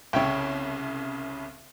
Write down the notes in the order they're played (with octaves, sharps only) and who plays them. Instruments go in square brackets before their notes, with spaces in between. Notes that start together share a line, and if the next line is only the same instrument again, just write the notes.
[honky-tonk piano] C2 C#3 [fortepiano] C#5 E5 G5